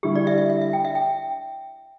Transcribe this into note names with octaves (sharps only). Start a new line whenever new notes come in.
D3 G3 E4 G4
D5
E5
E5
E5
E5
G5
E5
G5